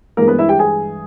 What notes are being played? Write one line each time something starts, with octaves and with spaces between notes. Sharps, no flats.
G2 E3 G#3 A#3 A#4
B3 B4
E4 E5
G4 G5
G#4 G#5